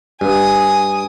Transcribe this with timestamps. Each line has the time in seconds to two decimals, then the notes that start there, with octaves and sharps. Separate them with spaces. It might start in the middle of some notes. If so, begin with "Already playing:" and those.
0.21 G2 G#5 D#6